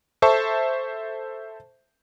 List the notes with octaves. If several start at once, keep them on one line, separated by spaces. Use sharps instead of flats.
A4 C5 E5 A5 C#6